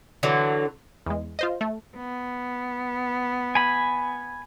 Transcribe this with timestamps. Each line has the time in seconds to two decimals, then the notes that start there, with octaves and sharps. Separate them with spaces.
0.23 D3 E3 F#3
1.06 E2 G#3
1.39 F4 C5 D#5
1.61 A3
1.97 B3
3.55 G#5 B5